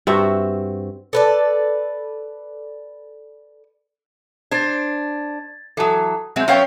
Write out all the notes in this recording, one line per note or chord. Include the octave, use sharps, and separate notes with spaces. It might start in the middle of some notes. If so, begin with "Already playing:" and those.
G2 C4 F#4 E5
A4 B4 D5
D4 C5 G#6 A6
E3 F#3 A4 A5 D#6
F#3 G#3 C4 E5 G6
F#3 B3 C#4 C#5 F5 G5